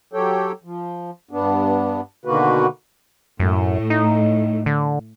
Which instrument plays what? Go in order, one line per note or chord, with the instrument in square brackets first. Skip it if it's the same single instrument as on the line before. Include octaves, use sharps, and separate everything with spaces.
[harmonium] F#3 G4 A4 C#5 G5
F3
G2 B3 D4
B2 D3 D#3 A#3 F#4 B4
[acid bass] F#2 [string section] A2
[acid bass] D#4
D3